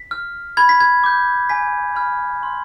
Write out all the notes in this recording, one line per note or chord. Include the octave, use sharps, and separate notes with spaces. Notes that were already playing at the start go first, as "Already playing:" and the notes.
Already playing: B6
F6
B5 G#6
B6
G#6
D6 G6
G#5 B6
B5 F6
C6